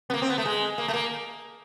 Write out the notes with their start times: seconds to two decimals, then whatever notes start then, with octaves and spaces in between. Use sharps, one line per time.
0.10 B3
0.14 A#3
0.22 C4
0.30 B3
0.38 A3
0.45 G#3
0.78 A#3
0.88 A3
0.93 A#3